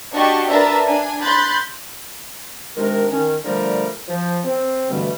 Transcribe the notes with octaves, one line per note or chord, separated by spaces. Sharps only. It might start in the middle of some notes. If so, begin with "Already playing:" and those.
D4 F#4 G4 D#5 A5 C#6
D4 A#4 B4 E5 A5 A#5
D4 G#5
B5 C6 F#6 G6 A6
C3 D#3 G#3 D4 A#4
D#3 C#4
D3 F3 G3 A3 A#4 D5
F3
C4
G2 B2 D3 E3 G3 A3